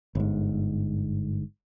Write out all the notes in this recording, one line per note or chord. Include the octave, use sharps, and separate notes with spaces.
G1 G#2